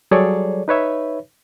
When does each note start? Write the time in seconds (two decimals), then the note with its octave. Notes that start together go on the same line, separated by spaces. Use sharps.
0.11 F#3 G3 G#4 A4 C#5 D5
0.68 D#4 B4 C#5 E5